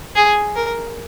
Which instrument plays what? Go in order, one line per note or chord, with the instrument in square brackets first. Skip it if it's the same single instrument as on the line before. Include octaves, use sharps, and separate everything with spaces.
[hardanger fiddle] G#4
A#4